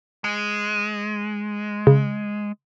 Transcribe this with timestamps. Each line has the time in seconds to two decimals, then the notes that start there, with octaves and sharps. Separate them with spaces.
0.24 G#3
1.87 C#3